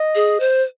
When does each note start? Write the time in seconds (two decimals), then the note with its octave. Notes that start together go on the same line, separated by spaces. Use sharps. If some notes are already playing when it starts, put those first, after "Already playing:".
Already playing: D#5
0.15 G#4
0.40 C5